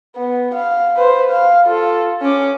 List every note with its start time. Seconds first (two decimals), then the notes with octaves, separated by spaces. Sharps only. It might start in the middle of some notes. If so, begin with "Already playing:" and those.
0.16 B3
0.54 F5
0.96 B4 C5
1.30 F5
1.64 F4 A4
2.22 C#4 D6